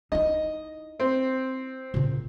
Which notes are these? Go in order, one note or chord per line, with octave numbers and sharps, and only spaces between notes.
D#4 E4 D#5
C4
A#2 C#3